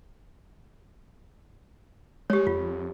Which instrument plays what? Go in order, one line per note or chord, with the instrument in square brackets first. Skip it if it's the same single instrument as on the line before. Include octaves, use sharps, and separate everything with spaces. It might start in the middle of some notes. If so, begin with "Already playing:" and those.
[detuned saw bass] G#3 [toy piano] G4 C#5
[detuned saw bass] F2 [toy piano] F4